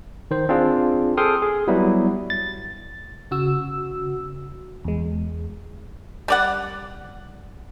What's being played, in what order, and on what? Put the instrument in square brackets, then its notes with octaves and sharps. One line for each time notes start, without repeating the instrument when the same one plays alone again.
[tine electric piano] D#3 C5
C4 D4 F4 G#4
G#4 A4 G5 C6 D#6 F6
G#4
F#3 G3 B3 E4
A6
[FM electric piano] C#3 F#4 E6
E2 G#3
[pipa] G3 D5 F#5